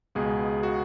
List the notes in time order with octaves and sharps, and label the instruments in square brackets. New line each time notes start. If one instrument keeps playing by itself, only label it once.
[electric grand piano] C#2 B2 G#3 B3 G#4
F#4